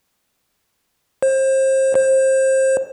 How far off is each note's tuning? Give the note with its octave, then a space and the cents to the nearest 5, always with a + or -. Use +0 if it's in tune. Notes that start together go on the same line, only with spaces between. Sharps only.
C5 +30
C5 +25